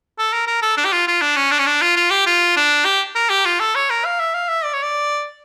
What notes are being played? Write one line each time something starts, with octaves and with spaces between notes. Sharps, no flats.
A4
A#4
A#4
A4
D4
G4
F4
F4
D4
C#4
D4
C#4
D4
F4
F4
G4
F4
D4
G4
A#4
G4
F4
A4
C#5
A#4
F5
E5
F5
E5
D5
C#5
D5